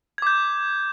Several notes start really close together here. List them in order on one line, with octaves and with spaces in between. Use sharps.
G#6 D6 G6